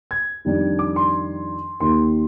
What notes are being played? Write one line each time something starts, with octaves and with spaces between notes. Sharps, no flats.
G#6
F2 D#3 G3 D4
D6
C6
D#2 D#3 A#3 C6